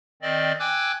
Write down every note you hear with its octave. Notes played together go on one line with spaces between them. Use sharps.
D#3 C4 D5 D#5
G5 G#5 D6 E6 F#6 G#6